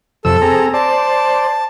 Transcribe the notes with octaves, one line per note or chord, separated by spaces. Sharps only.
F2 C3 A4 E6
C4 G#4 A#5
C5 D5 A5